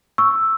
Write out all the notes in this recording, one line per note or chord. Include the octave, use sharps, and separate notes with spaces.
C#6 E6